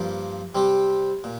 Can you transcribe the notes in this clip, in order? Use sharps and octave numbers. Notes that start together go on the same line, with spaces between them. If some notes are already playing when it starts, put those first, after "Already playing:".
Already playing: G2 F3 A#3
C3 G3 C4 G4
A#2